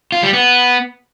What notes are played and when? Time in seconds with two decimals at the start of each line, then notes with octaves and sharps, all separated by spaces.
0.12 F4
0.23 G3
0.33 B3